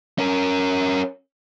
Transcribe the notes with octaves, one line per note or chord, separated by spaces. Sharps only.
C#4 A#4